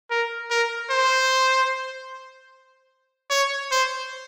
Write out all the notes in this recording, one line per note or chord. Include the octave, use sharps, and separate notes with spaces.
A#4
A#4
C5
C#5
C5